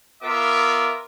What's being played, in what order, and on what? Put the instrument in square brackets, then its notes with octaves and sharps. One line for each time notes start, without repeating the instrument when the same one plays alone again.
[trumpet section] B3 F4 A#4 E5 D6